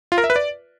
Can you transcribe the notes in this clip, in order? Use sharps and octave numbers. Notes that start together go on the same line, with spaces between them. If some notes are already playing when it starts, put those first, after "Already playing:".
F4
A#4
E5
B4
D5